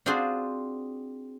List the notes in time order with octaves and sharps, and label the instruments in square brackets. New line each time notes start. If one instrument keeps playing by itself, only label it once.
[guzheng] C4 D4 F4 F#4 G#4 C5